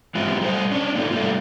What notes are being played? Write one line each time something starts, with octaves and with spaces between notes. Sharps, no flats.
G#3 B3 C4 E4 F4 G4
G3 A3 A#4 C5
C#4 D4
A#3 D#4 F4 A4
G3 A3 F4